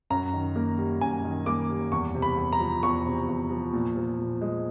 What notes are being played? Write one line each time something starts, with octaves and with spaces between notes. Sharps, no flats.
F#2 A#5
D#3
A#3
G3
F#2 G#5
D#3
A#3 D6
G3
E2 C#6
C3
B5
E2
A#5
F3
E2 C#6
C3
E2
F3
A#2
F3
A#2
G#3